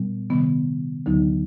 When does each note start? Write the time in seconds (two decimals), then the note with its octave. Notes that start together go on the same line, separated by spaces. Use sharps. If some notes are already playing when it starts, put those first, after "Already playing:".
Already playing: A#2 G3 B3
0.30 C3 D#3 G3 B3
1.06 D2 D3 F#3 B3 D#4